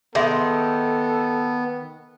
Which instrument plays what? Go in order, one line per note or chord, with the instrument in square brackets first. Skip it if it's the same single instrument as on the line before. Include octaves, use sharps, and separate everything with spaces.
[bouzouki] D#3 [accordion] B3 [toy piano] G#4 E5 C6 [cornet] A4